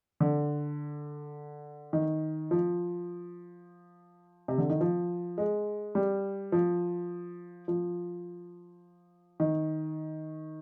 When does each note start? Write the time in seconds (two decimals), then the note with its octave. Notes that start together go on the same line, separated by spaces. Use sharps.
0.20 D3
1.93 D#3
2.51 F3
4.48 C3
4.58 D3
4.70 D#3
4.81 F3
5.38 G#3
5.95 G3
6.52 F3
7.68 F3
9.40 D#3